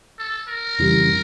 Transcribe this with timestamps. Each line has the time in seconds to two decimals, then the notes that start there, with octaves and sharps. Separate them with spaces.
0.18 A4
0.48 A#4
0.79 F2 C#3 E3 G3